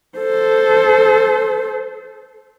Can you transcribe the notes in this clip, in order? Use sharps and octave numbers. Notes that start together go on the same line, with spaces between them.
A4 C5